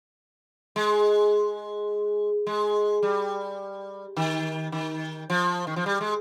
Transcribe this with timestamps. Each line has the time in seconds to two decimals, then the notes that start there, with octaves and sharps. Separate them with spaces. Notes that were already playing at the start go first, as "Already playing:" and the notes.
0.76 G#3
2.47 G#3
3.03 G3
4.16 D#3
4.72 D#3
5.30 F3
5.67 D#3
5.76 F3
5.86 G3
6.01 G#3